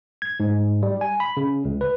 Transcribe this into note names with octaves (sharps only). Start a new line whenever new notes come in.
G#6
G#2
G3
G#5
B5
C#3
C#2
B4